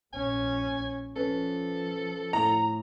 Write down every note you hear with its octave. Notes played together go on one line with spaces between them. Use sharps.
A#1 C#4 G#5
F3 C#4 A4 B4
A2 A#5